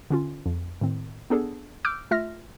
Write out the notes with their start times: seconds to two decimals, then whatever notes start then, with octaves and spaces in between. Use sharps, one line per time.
0.10 D3 C#4 F4
0.46 F2
0.81 A2 D#3 C4
1.30 B3 D4 G#4 A4
1.85 D6 E6 F6 G6 D7
2.11 A3 F4 E5 F6 A#6